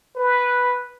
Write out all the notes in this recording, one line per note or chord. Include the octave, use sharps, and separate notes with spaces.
B4